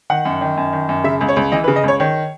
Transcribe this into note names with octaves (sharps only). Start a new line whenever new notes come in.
D#3 F#5
F#2
D#3
F#2
D#3
F#2
C#3 E5
C#2
C#5
C#2
E3 D#5
B4
C#3
D#5
C#2 C#5
D#3 C#5